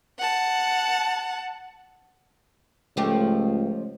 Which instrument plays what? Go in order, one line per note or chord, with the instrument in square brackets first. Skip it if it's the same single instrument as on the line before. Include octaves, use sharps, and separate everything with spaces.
[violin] F#5 A5
[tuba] C#2 [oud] F3 A3 G4